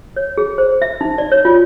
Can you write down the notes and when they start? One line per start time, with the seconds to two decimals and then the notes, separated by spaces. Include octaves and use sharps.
0.16 C#5
0.38 G#4
0.58 C5
0.82 E5
1.01 D#4
1.18 D5
1.32 C#5
1.45 F4